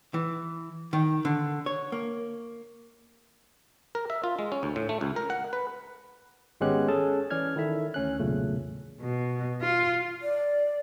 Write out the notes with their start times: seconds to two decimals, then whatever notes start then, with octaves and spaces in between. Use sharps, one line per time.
0.14 E3
0.93 D#3
1.25 D3
1.66 C#5
1.92 A#3
3.95 A#4
4.10 E5
4.24 F4
4.39 G#3
4.52 C#4
4.63 D2
4.76 A2
4.89 A3
5.01 C#2
5.16 A#4
5.30 F#5
5.53 B4
6.61 G#1 G#3 B3 C#4 G4 F#6
6.88 C#4 G#4 A4 A5
7.30 E3 C#4 D5 F6 G#6
7.56 D#3 E4 A4 E5
7.94 D2 C#4 F#6
8.19 B1 E2 A#2 C#3 A3
9.01 B2
9.61 F4
10.22 D5